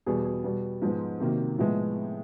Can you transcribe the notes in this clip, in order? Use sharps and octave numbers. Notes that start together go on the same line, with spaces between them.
E2 B2 G3 B3 G#4
G#4
B2 G3 B3
G#2 F3 G#3 B3
C3 D#3 F#3 A#3
A2 F3 G#3 B3